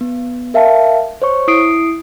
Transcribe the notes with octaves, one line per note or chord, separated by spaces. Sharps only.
B3
A#4 E5 F5 A5
C5 C#5 C#6
E4 D#6 C7 D7